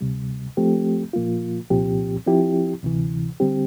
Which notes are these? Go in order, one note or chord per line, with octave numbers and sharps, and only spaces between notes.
D2 C3 G3
F3 A3 C4 G4
A#2 F3 A#3 F4
C2 A#2 F3 C4 G4
F3 C4 E4 G4
D2 C3 E3
D3 G3 C4 G4